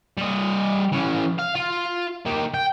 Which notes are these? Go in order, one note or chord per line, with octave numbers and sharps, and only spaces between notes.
G3 D#5
E3 C#4
F5
F4
A#3 G4
G5